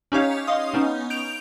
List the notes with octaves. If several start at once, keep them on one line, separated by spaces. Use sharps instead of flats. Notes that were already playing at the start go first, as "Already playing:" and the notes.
C#4 D#4 G4 C#5 F5
D#5 F5 C6 D#6
B3 C#4 D#4
G6 D7 F7